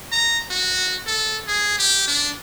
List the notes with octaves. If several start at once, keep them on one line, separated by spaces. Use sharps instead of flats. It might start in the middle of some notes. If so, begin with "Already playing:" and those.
A#5
F#4
A4
G#4
G4
D4